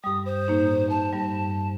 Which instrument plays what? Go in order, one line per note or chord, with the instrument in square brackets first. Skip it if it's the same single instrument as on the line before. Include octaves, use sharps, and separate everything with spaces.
[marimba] G2 G3 [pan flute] D#6
[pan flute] C5
[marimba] A2 A#3 D#4
[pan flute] A5
[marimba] G2 G3